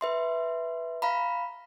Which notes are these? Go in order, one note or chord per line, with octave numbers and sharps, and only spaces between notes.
B4 E5 C6
F5 A#5 B5